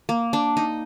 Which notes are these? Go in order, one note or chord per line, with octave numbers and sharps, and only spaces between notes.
A#3
D4
D#4